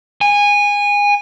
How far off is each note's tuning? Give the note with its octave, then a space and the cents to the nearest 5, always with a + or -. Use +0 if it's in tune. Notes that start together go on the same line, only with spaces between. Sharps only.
G#5 -20